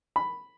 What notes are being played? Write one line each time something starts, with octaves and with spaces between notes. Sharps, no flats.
B5